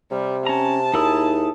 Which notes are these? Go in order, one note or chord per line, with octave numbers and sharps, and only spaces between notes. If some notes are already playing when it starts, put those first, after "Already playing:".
C3 G3
C#4 A5 A#5
D#2 D#4 E4 G#4